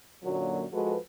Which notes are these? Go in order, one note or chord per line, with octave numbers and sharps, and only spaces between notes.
F#2 A#2 D3 F#3 A#3 F#4
F3 G#3 F#4 A4 B4